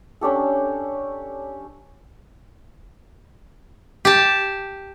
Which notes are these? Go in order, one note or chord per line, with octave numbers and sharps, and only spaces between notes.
C#4 D4 G4 A4
G4 A5